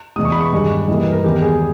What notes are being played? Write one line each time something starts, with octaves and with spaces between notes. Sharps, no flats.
E2 B2 G#3 D#6
C#6
B5
C#6
G2 D#3 G#3
G2 E3 G3 A#3 D#5
B4
A#4
E2 D#3 G#3 B3 G4
G#4